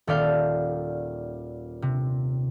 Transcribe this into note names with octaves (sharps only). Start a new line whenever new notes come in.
D#1 A4 D5 F5 G6
C3